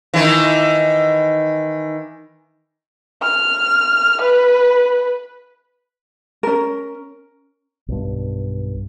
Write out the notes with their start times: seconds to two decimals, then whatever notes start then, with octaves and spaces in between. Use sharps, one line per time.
0.14 D#3 E3
3.23 F6
4.22 B4
6.43 C#4 A#4
7.88 B1 G2